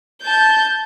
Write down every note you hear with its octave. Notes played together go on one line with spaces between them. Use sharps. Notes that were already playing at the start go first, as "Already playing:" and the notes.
A5 G6